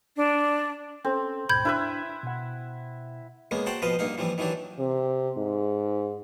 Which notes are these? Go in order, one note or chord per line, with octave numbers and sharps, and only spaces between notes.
D4
C4 C#4 A4
D2 G#2 B2 B5 G6 G#6
D4 E4 B4 E5
B2 F#5
C#3 G#3 A#3 B3
F#4 C5 F#5 G5 A5 A#5
B2 F3 B4 C5 D#5 F5
G2 A#3 D#4 F5
E3 F3 G3 C4
D#3 E3 F#3 D4 G4
C3
G#2